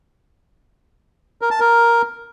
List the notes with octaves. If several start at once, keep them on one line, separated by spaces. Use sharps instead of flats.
A#4
A5
A#4